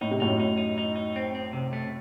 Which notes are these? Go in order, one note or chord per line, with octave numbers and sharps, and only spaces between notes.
A2 D#4
C3
F#2 A2 D#4
D#4
D#4
D#4
D#4
C4
C4
C3
A3